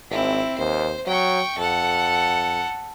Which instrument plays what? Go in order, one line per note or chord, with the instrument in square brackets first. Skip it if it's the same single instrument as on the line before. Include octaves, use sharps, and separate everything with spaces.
[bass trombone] G#1 [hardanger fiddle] C4 E4
[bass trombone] D#2 [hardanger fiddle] C5
[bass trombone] F#3 [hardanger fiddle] G5 C#6
[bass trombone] F2 [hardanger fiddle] A4 F#5